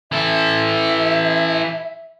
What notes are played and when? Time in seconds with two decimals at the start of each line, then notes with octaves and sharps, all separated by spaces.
0.12 E3 A4 E5